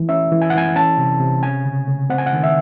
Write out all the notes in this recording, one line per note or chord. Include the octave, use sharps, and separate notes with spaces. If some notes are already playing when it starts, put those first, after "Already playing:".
Already playing: E3
C#4 E5
E3
G#5
F#5
E3 G#5
C#4 A5
C3
C3
C#4 G#5
C#3
C#3
C4 F#5
G#5
F#5
D#3
E5